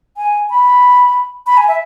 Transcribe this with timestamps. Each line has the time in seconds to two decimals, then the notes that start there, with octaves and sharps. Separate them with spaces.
0.17 G#5
0.50 B5
1.46 B5
1.57 G#5
1.68 E5